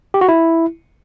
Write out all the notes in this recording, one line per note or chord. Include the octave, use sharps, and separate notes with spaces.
G4
F#4
E4